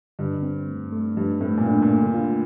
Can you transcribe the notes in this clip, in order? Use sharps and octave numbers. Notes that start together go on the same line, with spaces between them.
G2 D3
C4
A3
A3
G2 F3
A2 C4
A#2
A2 D4
A#2
A3
D3
F4